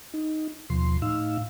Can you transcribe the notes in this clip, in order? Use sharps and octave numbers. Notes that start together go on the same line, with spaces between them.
D#4
D#2 B2 F3 C6
A2 D#4 F5 E6